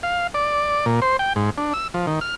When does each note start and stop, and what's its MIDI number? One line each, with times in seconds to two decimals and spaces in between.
0.03 0.27 77
0.34 0.86 74
0.86 1.00 46
1.02 1.17 72
1.19 1.33 79
1.36 1.50 44
1.58 1.73 62
1.74 1.88 88
1.94 2.06 53
2.07 2.20 51
2.21 2.35 89